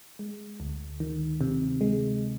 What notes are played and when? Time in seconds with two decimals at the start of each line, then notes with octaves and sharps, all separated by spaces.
0.19 G#3
0.60 D2
1.00 D#3
1.41 C3
1.81 G#3